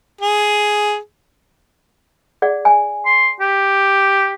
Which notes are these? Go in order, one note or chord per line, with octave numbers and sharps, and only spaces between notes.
G#4
G#4 D5 F#5
G#5
C6
G4